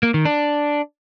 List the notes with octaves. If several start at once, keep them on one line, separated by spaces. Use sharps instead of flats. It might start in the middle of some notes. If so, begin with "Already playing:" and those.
A#3
D#3
D4